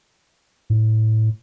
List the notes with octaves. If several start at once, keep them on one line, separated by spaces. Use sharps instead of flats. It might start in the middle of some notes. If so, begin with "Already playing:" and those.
A2